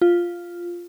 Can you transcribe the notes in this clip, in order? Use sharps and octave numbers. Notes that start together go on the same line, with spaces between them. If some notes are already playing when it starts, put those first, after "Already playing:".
F4